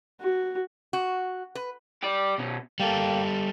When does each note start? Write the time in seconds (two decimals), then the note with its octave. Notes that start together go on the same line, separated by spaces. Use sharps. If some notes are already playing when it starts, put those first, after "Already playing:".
0.21 F#4
0.93 F#4
1.55 B4
2.03 G4 D5
2.39 B2 C#4
2.80 G3 A#3 A4 G5